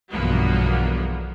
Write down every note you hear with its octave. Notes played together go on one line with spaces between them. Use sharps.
B1 E2 G2 F3 A#3 B3